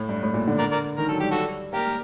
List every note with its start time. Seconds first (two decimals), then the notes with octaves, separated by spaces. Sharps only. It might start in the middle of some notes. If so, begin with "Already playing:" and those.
Already playing: A2
0.09 G2
0.23 A2
0.34 A#2
0.47 D3
0.59 A#4 D5
0.72 A#4 D5
0.97 D#3 A#4
1.08 F#3 A4
1.20 G3 G4
1.31 F#4 A4
1.73 A#3 G4 A#4